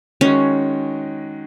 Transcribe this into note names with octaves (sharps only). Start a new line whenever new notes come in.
D#3 G#3 C#4 D#4 F#4 C#5